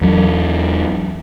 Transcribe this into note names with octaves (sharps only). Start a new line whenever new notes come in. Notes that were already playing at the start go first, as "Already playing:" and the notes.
E2 F#3